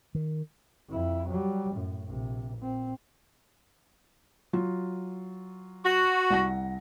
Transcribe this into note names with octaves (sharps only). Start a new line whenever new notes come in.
D#3
F2 E4
F#3 G3
F#2 A2
A#1 C3
A#2 C4
F#3 F4
F#4
C2 F#5 A#6